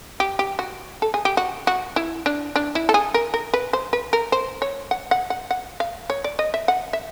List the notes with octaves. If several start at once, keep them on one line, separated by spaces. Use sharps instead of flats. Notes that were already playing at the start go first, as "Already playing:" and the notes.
G4
G4
F#4
A4
G#4
G4
F#4
F#4
E4
D4
D4
E4
A4
G#4
A#4
A#4
B4
C5
B4
A#4
C5
C#5
F#5
F#5
F#5
F#5
F5
C#5
D5
D#5
E5
F#5
E5